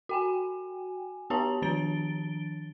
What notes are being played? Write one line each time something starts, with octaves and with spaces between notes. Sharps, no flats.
F#4 G5 G#5
B3 G4 C#5 A5 A#5
D#3 F3 D4 A6 D7 G7